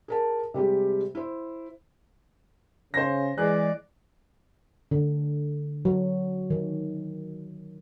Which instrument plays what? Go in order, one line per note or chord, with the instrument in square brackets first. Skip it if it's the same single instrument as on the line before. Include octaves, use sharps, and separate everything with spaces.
[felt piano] G#4 A#4 A5
C3 G3 G#3 G4
E4 C5
[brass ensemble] C#3 [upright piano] C5 A#6
[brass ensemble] E3 G#3 [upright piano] G#4 F#6 [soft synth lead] D5
[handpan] D3
F#3
D#3